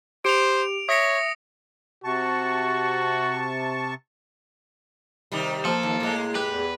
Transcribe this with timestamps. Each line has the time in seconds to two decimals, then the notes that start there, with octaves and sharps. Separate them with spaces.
0.25 G4 C5 D7 F7
0.89 C#5 E5 D#6 A#6 C#7
2.04 C3 F#4 A5 C#6
5.32 C3 D#3 G3
5.65 F3 A#3 A4
5.83 D#2
6.00 A2 G#3
6.35 G4 B4
6.48 E2